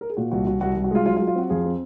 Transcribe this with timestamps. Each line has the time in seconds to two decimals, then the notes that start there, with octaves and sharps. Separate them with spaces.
0.01 A#4
0.10 G#4
0.17 A#2 F#4
0.31 C2 F#4
0.47 C2 F#4
0.61 C2 F#4
0.77 C2
0.84 F#4
0.91 G#3 F4
1.06 F#3 F4
1.16 F4
1.20 F#3
1.27 F4
1.35 C4 F#4
1.50 F2 F4 G#4
1.65 C4